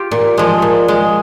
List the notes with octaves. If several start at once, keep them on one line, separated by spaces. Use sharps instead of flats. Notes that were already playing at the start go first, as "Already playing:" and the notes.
Already playing: F4 G4
A#2
F3 G#3
A#2
G#3